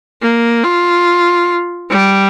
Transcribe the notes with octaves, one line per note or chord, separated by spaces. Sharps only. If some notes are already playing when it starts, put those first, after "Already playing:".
A#3
F4
G3